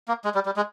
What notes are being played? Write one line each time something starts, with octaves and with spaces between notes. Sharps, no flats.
A#3
G#3
G3
G3
G#3